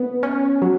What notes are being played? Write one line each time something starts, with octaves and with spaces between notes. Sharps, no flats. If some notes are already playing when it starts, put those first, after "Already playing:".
Already playing: B3
C#4
F#3